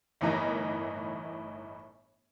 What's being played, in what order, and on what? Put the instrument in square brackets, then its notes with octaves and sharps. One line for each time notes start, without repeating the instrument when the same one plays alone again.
[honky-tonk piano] G1 A2 E3 D#4 A#4